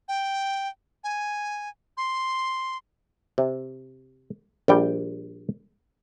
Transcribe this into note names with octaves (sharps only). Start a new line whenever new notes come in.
G5
G#5
C6
C3
A#1 G3 G5